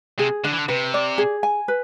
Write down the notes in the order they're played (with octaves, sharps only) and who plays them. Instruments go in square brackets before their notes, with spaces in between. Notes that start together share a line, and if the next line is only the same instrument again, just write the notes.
[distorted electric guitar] C3 [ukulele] G#4
[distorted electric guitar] D3 [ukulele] D4
[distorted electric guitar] E3
D3
[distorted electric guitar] C3 [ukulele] B4
[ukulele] D5
G#4
G#5
B4